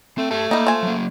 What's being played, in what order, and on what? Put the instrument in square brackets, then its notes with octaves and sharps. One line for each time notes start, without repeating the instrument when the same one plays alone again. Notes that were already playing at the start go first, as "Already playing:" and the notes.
[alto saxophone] A3 [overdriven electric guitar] C4
[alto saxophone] A3 [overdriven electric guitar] G4 A5
[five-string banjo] G3 D#4 [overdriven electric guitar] A#3
[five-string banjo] F3 G#5
[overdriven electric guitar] F#3 A#3